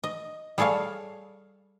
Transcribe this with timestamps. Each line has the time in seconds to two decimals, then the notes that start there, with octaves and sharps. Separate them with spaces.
0.04 D#5
0.58 G3 G#4 A4 C#5 F5